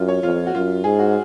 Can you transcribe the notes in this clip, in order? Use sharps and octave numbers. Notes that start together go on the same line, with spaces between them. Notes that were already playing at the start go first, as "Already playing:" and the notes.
Already playing: F#2 F4
C#5
F2 F4
F#4
F#2 F4
G#2 G#4
F#4